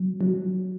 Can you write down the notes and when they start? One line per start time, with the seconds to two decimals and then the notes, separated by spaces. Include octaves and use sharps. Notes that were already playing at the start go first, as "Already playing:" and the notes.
Already playing: F#3
0.21 F#3